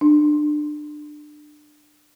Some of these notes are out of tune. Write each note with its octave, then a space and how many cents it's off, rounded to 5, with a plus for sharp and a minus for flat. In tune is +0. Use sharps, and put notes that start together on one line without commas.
D4 +25